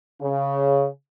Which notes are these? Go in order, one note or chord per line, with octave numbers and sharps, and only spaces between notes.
C#3